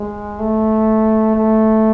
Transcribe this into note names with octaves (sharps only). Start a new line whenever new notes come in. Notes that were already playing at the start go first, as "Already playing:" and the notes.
Already playing: G#3
A3
A3